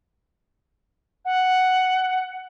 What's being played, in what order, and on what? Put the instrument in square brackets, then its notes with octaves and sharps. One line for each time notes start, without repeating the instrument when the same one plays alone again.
[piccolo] F#5